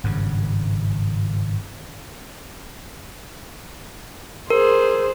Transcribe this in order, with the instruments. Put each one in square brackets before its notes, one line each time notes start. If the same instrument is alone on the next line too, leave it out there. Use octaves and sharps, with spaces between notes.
[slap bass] G#1 G2 C#3
[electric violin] G#4 C5 [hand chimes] A#4